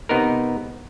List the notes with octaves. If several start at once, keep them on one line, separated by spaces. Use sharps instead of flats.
C3 B3 D#4 A#4